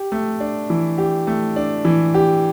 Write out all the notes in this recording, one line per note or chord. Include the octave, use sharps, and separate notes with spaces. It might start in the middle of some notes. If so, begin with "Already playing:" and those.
Already playing: G4
A3
D4
E3
G4
A3
D4
E3
G4